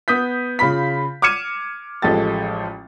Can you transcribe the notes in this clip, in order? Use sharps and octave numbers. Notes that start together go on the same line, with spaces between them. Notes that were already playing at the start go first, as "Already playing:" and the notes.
B3 D#6 G6 B6
C#3 F4 B5 B6
D6 F6 G#6 C#7 D#7 E7
A1 F3 G#3 G4 A4 A6